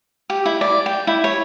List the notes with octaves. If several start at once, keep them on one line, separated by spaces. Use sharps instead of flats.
G4
E4
D5
G5
E4
C#5